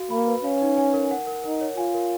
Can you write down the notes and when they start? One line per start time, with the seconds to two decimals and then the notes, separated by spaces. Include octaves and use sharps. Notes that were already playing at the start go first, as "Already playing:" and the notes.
Already playing: F#4 F5
0.10 A#3 B5
0.27 B4
0.44 C#4 F5
0.61 D#4
0.77 G#5
0.94 A#4
1.11 F#5
1.27 A#4
1.44 D#4 A#4
1.61 C#5
1.77 F4 G#5
1.94 A#4